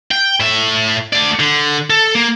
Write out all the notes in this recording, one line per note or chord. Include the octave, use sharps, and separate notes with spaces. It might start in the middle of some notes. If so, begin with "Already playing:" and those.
G5
A2 E5
A3 D5
D3
A4
A#3